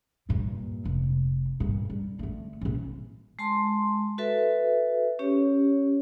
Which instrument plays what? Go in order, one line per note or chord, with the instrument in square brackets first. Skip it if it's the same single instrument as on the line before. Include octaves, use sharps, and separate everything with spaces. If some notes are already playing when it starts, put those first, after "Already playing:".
[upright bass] G2 A#2
F1
G2 A#2
G3
D3 A3
A#1 C#4
[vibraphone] G#3 A5 C6
F#4 A4 B4 E5
C#4 G4 C#5